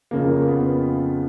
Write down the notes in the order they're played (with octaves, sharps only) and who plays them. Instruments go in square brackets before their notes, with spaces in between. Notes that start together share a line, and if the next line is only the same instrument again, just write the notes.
[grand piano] F2 C#3 F3 A#3
B3